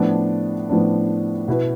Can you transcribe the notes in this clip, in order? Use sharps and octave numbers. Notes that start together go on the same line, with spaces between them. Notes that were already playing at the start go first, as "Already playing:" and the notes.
Already playing: A2 F3 B3 D4
A2 F3 B3 D4
B2 B3 E4 B4